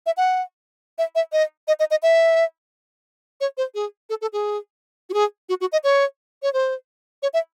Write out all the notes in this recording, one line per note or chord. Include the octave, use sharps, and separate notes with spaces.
E5
F#5
E5
E5
D#5
D#5
D#5
D#5
E5
C#5
C5
G#4
A4
A4
G#4
F#4
G#4
F#4
F#4
D#5
C#5
C#5
C5
C#5
E5